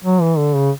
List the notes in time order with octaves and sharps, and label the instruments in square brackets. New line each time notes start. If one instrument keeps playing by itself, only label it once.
[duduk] F#3
E3
D3
C#3